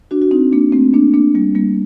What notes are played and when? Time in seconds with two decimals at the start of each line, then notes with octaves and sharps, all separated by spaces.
0.11 D4 F#4
0.22 F#4
0.31 C4 D#4
0.52 A#3 D4
0.72 A3 C4
0.93 A#3 D4
1.13 A#3 D4
1.35 G3 A#3
1.55 G3 A#3